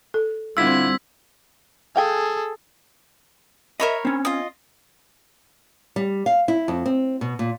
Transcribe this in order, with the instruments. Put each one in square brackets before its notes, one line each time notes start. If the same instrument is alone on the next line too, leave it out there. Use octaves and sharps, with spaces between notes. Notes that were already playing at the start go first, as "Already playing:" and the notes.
[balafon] A4
[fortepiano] D3 E4 F4 [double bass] G3 C4 [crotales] E6 G#6 B6
[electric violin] G#4 A4 [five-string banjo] F5 G5 G#5
[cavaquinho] A#4 C#5 B5 [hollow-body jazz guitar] D#5 E5
[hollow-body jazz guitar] C4 C#4
[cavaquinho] F4 D#5
[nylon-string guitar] G3
F5
E4
F2
C4
B2
A#2